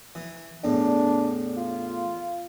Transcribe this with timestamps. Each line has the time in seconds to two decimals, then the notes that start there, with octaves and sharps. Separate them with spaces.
0.15 E3
0.64 E2 A2 D4
1.57 F4